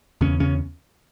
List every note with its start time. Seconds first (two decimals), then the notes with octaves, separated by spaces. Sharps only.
0.21 E2 C#3 C#4
0.40 C#3 C#4